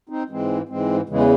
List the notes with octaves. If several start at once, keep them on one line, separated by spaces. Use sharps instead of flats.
C4 D#4
G#2 E3 G#3 C4
G#2 E3 G#3 C4
E2 C#3 E3 G#3